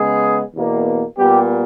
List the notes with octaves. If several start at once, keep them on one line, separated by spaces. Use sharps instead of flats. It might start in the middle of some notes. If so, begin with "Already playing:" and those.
Already playing: C#3 G#3 B3 G#4
E2 B2 A#3
A#2 G3 B3 G4